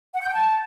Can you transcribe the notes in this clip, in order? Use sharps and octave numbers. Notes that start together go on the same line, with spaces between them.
F#5
G6
G5
A5